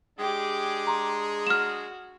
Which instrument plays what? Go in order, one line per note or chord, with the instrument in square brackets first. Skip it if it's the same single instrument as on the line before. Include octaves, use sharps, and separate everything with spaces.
[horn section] G#3 D4 G#4 [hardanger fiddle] G4 D6
[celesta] A#5 C6
[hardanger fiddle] F#4 [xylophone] F6 E7